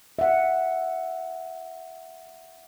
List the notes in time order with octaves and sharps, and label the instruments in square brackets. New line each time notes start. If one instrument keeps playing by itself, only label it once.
[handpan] E5 F#5